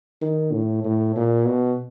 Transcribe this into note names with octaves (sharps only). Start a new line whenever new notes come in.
D#3
A2
A2
A#2
B2